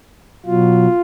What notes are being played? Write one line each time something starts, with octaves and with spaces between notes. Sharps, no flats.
B2 F#3 F4